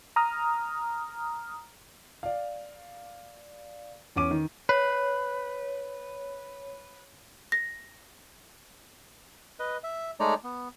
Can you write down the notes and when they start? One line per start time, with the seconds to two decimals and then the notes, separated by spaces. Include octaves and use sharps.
0.16 A#5 D#6 F6
2.23 D5 F5
4.16 E2 C#4 D6 D#7
4.31 D#3
4.69 B4 C#5
7.52 A#6
9.59 B4 D#5
9.84 E5
10.20 G#3 A3 D#4 C#5 D5 A#5
10.44 B3